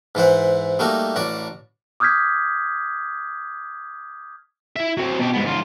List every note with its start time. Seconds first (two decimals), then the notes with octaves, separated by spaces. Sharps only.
0.15 G#2 E3 C5 F#5
0.79 G3 A3 A#3 D#4 F#4
1.16 A1 F#4 D5
2.00 D6 D#6 F6 G6 G#6 B6
4.76 E4 E5
4.97 F#3 C4
5.20 B2 G4
5.34 G#2 B3
5.45 G#2 F4